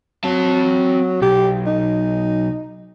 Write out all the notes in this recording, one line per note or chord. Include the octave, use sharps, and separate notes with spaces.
F#3 C4 A5
B1 G4
D#4